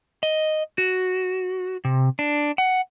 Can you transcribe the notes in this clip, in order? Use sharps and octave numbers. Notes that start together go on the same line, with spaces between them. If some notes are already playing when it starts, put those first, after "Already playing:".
D#5
F#4
C3
D4
F#5